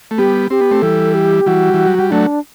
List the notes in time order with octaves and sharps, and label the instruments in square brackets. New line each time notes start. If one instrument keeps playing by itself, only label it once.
[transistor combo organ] A3
[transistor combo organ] G3 B3 [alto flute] G4
[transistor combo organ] C4 [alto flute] G4
[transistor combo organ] B3
A3 C4
[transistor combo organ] E3 G3 [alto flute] A4
[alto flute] G4
[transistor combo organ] E3 G3 [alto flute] F#4
[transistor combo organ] E3
F#3
G3
[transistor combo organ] F#3 A3 [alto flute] D4